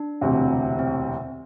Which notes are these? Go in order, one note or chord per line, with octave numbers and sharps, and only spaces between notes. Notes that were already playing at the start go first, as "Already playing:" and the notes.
Already playing: D4
E1 D2 C3
C4